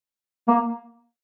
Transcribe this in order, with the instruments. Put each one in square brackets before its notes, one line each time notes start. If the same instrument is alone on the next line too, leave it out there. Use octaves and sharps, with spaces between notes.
[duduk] A#3